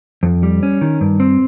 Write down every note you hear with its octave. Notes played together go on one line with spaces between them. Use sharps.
F2
G3
C#4
D#3
G2
C4